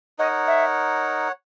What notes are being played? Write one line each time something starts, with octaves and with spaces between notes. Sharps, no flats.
D#4 A#4 C#5 D#5 F#5
E5